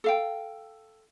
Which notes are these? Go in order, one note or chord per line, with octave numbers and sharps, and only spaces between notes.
A4 F5 G5